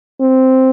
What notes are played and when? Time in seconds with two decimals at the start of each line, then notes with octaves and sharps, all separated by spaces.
0.21 C4